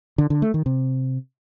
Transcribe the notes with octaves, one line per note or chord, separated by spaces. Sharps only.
D3
D3
A3
D#3
C3